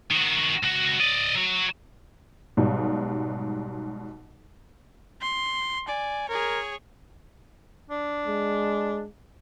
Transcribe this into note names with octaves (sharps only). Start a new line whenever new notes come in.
D#3 F#4
C#2 F#4
D5 D#5
F#3 F#4
B1 G#2 B2 G3
C6
D5 G#5
G#4 A#4 C#5
D4
G#3